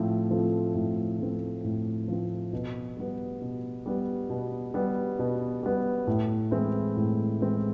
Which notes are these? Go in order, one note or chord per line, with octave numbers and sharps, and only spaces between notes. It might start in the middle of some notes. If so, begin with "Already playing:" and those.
Already playing: A2 F3 A3 C4
F3 A3 C4
A2
F3 A3 C4
A2
F3 A3 C4
B2
G3 B3
B2
G3 B3
B2
G3 B3
B2
G3 B3
A2
E3 G#3 C4 E4
A2
E3 G#3 C4 E4